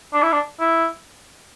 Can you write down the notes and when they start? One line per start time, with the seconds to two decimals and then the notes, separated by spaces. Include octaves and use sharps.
0.14 D4
0.23 E4
0.32 D4
0.59 E4